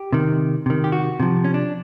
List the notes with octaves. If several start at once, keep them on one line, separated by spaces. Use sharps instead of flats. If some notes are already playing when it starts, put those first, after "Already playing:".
Already playing: G4
C3 D#3
C3 D#3
G4
F#4
C3 F3
C#4
D4